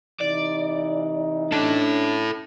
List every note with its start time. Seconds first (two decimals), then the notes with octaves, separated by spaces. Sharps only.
0.21 C3 E3 D#4 D5
1.52 C#4 D4 E4 A4